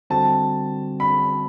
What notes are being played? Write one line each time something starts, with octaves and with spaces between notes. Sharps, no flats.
D3 G3 C4 F#4 A5
B5